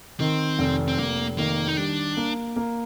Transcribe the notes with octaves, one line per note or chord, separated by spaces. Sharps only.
D#3 C4
F1
C4
F1 A#3
D#3 A#3
D#4
G3 D4
A#3
A#3